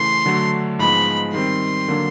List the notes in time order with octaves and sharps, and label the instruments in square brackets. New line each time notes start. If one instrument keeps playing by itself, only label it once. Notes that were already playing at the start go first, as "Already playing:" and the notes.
Already playing: [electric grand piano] C#3 E3 A3 [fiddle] C6
[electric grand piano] D3 F#3 A3 D4 F#4
[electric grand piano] G#2 F3 G#3 B3 [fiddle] B5
[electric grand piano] D#3 G3 C4 [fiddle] C6
[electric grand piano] D3 F#3 A#3 D4